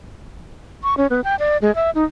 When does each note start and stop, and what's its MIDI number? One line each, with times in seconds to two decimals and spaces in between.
0.83 0.95 85
0.97 1.07 61
1.10 1.21 59
1.24 1.35 79
1.39 1.57 74
1.62 1.73 56
1.75 1.90 76
1.95 2.05 63